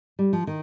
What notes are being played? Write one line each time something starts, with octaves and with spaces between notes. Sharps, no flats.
G3
F3
D#3